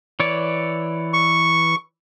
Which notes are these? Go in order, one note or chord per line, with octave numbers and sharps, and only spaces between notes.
E3 C#5 D5
C#6